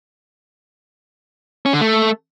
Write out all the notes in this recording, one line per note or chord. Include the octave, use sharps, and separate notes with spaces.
C#4
D3
A3